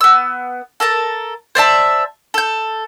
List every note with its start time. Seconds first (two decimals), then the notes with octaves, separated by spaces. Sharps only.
0.01 B3 E6
0.80 A4 A#4 A5
1.55 C5 D5 E5 A5
2.34 A4 G6